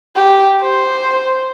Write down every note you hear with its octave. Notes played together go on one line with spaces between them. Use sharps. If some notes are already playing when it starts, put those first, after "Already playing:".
G4
C5